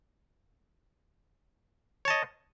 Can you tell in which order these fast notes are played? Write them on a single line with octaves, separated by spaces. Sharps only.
C#5 A5 D#5